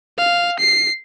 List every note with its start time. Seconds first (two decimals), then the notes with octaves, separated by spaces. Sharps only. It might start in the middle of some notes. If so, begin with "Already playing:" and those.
0.18 F5
0.59 C7